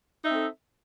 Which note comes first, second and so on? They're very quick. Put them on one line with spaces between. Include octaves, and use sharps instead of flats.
D#4 E5 C4 A4